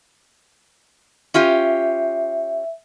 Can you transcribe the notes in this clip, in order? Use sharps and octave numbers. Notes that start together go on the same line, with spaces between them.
C#4 F4 G4 E5